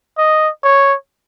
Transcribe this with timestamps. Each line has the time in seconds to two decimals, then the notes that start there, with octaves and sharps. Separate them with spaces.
0.18 D#5
0.64 C#5